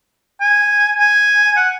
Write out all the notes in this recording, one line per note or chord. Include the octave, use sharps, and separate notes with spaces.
G#5
G#5
F#5